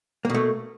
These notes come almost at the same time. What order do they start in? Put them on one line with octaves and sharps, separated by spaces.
A#3 B2 A3